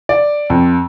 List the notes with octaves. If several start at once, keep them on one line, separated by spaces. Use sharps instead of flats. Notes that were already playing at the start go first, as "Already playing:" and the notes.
D5
F2